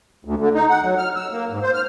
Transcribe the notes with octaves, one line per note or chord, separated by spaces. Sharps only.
D2
D3
D#4
F#5
F#3
F6
E6
A#3
G#2
C5
F6